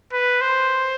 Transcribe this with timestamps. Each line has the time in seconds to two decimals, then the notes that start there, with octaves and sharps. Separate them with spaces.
0.13 B4
0.41 C5